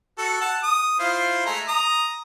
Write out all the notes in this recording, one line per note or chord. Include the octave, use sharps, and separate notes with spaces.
F#4 A4
F#5 A5
D#6
E4 F4 C5
G#3 A3 A#5
A#5 D#6